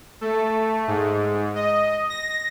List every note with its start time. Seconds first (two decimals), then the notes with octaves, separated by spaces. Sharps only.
0.21 A3
0.88 G#2
1.55 D#5
2.10 A#6